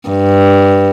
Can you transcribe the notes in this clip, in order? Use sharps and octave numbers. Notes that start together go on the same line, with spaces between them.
G2